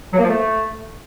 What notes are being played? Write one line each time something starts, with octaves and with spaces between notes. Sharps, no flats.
F#3
A#3
F3
A3